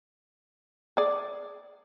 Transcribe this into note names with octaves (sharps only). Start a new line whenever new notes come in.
G#4 D5